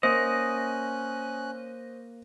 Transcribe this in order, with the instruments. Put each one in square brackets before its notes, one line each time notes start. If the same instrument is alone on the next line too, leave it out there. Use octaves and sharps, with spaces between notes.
[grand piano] A#3 [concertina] C#4 F#6 [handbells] C5 [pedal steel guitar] D#5